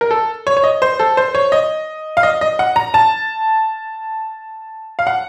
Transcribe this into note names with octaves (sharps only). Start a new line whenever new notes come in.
A#4
A4
C#5
C#5
D#5
C5
A4
C5
C#5
D#5
F5
D#5
D#5
F#5
A#5
A5
F5
F#5